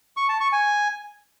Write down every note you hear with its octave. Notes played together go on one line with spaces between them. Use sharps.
C#6
A5
C#6
G#5